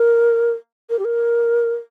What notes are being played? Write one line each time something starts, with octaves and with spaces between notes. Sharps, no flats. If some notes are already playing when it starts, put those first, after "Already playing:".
Already playing: A#4
A#4
G4
A#4